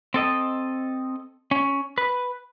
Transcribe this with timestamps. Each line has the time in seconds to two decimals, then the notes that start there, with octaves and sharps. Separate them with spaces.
0.14 C4 A4 D#5
1.51 C#4
1.98 B4